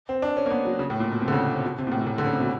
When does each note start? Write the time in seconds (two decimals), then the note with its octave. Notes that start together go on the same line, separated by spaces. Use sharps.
0.09 C4
0.22 D4
0.37 C#4
0.46 A#3
0.51 B3
0.65 F#3
0.79 C#3
0.90 A2
1.00 A#2
1.12 B2
1.21 C3
1.28 D3
1.32 C#3
1.53 C3
1.64 B2
1.78 C3
1.87 A#2
1.92 A2
2.02 A#2
2.07 A2
2.18 D3
2.26 C#3
2.33 C3
2.41 B2